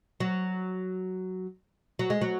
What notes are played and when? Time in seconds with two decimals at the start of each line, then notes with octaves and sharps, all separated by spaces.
0.20 F#3
1.99 F#3
2.10 G#3
2.21 F#3